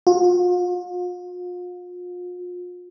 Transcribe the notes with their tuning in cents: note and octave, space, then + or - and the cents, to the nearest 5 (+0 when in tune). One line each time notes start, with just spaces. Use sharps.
F4 +40